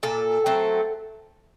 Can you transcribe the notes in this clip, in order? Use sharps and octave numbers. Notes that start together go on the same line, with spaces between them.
A#2 A4
F#3 A3 C4